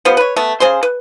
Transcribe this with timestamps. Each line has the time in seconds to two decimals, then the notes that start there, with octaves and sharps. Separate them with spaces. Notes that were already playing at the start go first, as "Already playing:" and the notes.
0.05 F3 G3 B3 C5
0.17 B4 C#5
0.36 A3 B3
0.60 C#3 G#4 C5 C6
0.83 B4